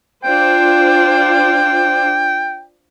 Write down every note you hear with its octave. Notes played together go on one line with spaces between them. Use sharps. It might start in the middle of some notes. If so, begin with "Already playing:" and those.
D4 F4 C5 G5